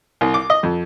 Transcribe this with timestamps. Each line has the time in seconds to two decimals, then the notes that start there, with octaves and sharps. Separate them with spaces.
0.21 C2
0.34 D6
0.50 D#5
0.63 F2